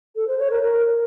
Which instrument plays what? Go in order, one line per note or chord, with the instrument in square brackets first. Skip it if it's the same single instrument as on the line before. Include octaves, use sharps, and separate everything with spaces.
[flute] A4
C5
C#5
A#4
A#4